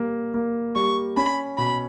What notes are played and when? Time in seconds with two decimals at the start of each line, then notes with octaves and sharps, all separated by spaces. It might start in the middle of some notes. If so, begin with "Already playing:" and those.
Already playing: G3 A#3
0.34 A#3
0.76 G3 C#6
1.17 C#4 B5
1.58 B2 B5